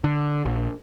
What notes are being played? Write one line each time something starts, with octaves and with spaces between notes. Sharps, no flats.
D3
A#1